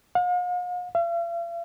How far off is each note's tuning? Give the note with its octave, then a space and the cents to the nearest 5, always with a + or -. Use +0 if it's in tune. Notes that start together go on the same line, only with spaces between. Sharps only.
F5 +45
F5 -45